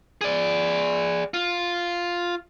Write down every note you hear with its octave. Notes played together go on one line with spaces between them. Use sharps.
G#4 D5
F4